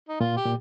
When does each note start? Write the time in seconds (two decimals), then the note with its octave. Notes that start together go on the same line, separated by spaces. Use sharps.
0.09 D#4
0.20 A#2 F4
0.37 G4
0.46 A#2